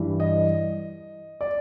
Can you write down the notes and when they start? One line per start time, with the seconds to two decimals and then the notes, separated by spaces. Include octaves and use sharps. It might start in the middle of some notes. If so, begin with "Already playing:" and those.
Already playing: G2 E3
0.20 D#5
1.41 D5